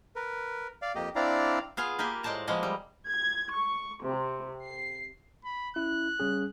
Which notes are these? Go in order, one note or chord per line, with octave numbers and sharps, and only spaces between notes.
A#4 B4
D5 F5
F2 A#3 G4 D#5
C4 D4 E4 D5 F5 A#5
B3 F4 G#4 F5
A#3 G4 A#4 B4 G5 G#5
A2 G#3 C5 D5 A5 A#5
F3 G#3 A#3 B3 D#5
G3
G#6
C#6
C3
C7
B5
C#4 E4 F#6
G3 C#4 G#4